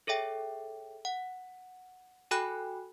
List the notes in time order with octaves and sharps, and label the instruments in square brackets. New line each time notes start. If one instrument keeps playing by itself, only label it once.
[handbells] G#4 A4 C#5 E5 G5
F#5
F#4 A4 G5 G#5 B5 F#6